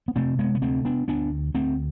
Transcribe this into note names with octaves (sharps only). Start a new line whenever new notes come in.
B3
C3 A3 C4
G#3 B3
B3
D2 A3 C4
B3 D4
D2 B3 D4
D2 A3 C4